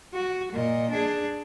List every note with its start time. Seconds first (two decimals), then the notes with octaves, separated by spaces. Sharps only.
0.14 F#4
0.52 A#2 D#5
0.90 D4 G#4